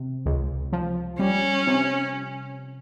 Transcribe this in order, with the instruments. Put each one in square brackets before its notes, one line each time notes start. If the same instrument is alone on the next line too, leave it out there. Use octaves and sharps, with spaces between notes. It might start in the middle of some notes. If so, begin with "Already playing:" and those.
Already playing: [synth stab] C3
C#2
F3
[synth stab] G3 [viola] C#4
[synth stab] C3